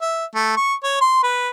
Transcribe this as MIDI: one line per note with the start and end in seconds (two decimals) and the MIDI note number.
0.01 0.25 76
0.34 0.54 57
0.57 0.74 85
0.83 1.00 73
1.01 1.19 84
1.23 1.50 71